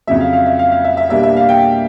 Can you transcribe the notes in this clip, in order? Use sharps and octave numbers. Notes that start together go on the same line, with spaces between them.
F2 C#3 F#3 E5
F5
F5
E5
F5
F5
E5
E5
B2 G3 A#3 D4 E5
E5
F5
G5